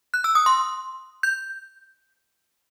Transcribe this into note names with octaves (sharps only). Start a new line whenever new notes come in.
F#6
E6
D#6
C6
G6